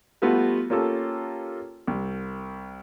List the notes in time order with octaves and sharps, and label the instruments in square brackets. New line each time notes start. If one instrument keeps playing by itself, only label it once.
[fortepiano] G3 A3 B3 F4 F#4
A#3 C#4 F4 G4 A4
C2